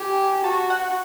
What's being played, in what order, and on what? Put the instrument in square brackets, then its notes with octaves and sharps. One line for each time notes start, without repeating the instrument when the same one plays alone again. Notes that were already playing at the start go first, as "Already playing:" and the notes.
Already playing: [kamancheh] G4 [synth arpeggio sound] G#5
[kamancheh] F#4 [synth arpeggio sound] A5
[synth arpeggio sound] F#5